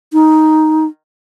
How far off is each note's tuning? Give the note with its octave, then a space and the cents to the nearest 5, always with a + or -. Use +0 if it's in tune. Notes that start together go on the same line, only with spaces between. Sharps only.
D#4 +5